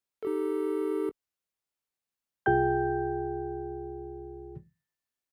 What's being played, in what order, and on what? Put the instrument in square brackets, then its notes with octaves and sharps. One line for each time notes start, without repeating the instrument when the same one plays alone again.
[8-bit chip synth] D#4 G4 A4
[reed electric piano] C2 F4 G#4 G5 G6